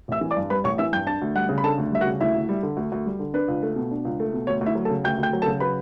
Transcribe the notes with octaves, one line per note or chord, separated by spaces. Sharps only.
A1 E5 E6
E3
D5 D6
G2
G3 B4 B5
A1 C#5 C#6
E3 E5 E6
G2 G5 G6
D4 A5 A6
D2
G3 F#5 F#6
C#3
B5
D4 A4 A5
D2
G3 E5
F#4 F#5
C#3
D2 E4 E5
D2
G3
D3
D2
D2
G3
D3
D4 B4
C#2
A3
B2
D4
C#2
A3
B2
D2 C#5
D2
E4 E5
F#3
A4 A5
C#3
D2 G5 G6
D2 G5 G6
F#3
A4 A5
C#3
F#3 B4 B5